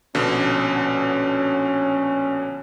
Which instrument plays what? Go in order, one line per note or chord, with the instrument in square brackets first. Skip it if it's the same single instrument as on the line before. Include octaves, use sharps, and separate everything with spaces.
[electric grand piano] A#1 B2 D3 [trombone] C#4